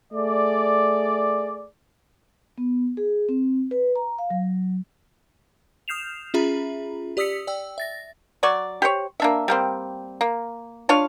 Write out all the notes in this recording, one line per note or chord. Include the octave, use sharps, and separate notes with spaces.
A3 G#4 D5
B3
G#4
C4
B4
A#5
F5
F#3
D#6 F6 G6 C7 E7 F7
C#4 F4 G#4 E5 A#5 B5
G4 D5 D#6 E6 B6 C#7
D5 G5 E6
E5 A6 A#6
F#3 D5 C#6
G4 C5 C#5
A#3 D4 E5
G3 A#3 C4
A#3
D4 F4 C#5 F5